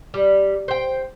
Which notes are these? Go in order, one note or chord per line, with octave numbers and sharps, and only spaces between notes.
G3
C5 G5